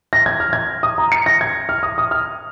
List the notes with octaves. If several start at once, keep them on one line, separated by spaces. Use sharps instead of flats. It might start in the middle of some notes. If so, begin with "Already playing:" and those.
A#6
G#6
F6
G#6
D#6
A#5
C#7
A#6
G#6
F6
D#6
D#6
F6